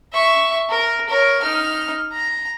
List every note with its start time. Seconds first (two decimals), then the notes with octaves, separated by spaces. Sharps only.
0.13 E5 C#6
0.70 A#4
1.09 A#4 C#5
1.42 D#4 F6
2.12 A#5